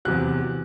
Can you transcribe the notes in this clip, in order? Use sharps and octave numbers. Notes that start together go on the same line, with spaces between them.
E2 C3 F#3 F#6